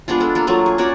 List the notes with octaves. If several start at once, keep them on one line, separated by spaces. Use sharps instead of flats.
G#3 B3 D4 F4
D4 A4
A#3 A4
F#3 A3 A#3 F4
G#4
C#4 F#4 C#5 D5